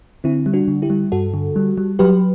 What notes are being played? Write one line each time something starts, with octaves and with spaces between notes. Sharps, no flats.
D3 C4 E4
G3
D4 F#4
D3
E4 G4
G3
G2 F#4 A4
D3
G3
G3
F#3 G4 B4